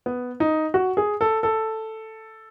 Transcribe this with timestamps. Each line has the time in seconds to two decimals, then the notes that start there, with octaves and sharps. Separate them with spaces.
0.06 B3
0.40 D#4
0.74 F#4
0.97 G#4
1.21 A4
1.43 A4